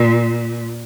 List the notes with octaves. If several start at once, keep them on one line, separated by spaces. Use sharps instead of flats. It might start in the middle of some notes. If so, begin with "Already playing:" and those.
Already playing: A#2